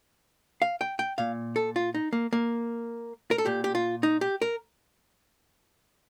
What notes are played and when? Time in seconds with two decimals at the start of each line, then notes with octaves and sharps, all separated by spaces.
0.62 F5
0.81 G5
0.99 G5
1.18 A#2 F5
1.56 A4
1.76 F4
1.94 D#4
2.13 A#3
2.33 A#3
3.31 A#4
3.38 A4
3.46 A#2 G4
3.64 G4
3.75 F4
4.03 D#4
4.21 G4
4.42 A#4